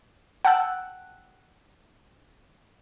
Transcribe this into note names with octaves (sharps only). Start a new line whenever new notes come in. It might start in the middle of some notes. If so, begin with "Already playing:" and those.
F#5 G5 A5 E6 F#6